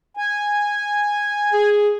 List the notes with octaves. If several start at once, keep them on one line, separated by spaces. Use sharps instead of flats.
G#5
G#4